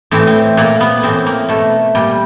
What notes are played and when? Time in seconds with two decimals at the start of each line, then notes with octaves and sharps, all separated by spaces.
0.11 A2 E3 C4
0.27 C4
0.57 A#2 A#3
0.81 B3
1.03 A2 E3 C4
1.26 A#3
1.49 B2 A3
1.95 A#2 G3